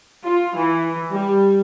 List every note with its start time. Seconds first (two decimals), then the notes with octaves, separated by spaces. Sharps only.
0.23 F4
0.55 E3
1.12 G3